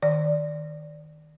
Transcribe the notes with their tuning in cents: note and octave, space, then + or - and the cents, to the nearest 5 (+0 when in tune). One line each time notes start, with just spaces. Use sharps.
D#3 +0 D5 +0